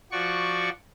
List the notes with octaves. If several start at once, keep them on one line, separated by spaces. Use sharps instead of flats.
F3 F#4 D5 C#6